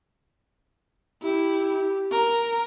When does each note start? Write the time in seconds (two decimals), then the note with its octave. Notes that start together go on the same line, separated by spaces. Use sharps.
1.22 E4 G4
2.11 A#4